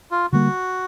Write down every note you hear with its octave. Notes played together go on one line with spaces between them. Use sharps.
F4
D3 G3 A#3 F#4